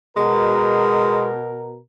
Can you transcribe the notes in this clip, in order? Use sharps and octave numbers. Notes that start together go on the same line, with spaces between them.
B2 G#3 A#4